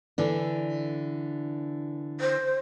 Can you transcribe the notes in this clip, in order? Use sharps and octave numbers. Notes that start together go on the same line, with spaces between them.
D3 E3 D4
C5